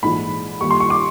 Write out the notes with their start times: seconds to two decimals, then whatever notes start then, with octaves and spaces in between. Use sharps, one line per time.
0.02 A#1 G#2 E3 G#3 B5
0.61 D#2 D#3 G3 C#6
0.71 C6
0.80 C#6
0.90 D6